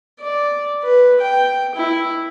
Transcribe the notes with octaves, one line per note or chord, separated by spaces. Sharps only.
D5
B4
G5
E4